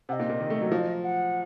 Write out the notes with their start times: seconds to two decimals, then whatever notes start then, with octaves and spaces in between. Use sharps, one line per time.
0.09 C3 F#5
0.13 D#5
0.20 A#2
0.30 A#2
0.40 D#3
0.50 A3
0.61 F#3
0.72 F3
1.03 F#5